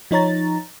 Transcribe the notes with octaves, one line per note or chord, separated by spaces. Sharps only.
F3 D#4 C#5 A#5 A6